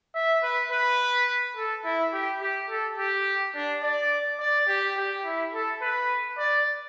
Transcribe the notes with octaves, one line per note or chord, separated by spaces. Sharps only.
E5
B4
B4
A4
E4
G4
G4
A4
G4
D4
D5
D5
G4
G4
E4
A4
B4
D5